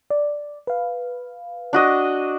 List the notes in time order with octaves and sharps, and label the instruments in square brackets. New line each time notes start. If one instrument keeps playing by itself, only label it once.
[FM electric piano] D5
B4 F5
[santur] D4 F#4 D#5